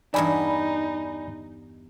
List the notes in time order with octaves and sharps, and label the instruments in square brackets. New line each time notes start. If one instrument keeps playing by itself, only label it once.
[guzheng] E2 G2 E4 [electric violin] D#4 [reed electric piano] D5 G#5 B5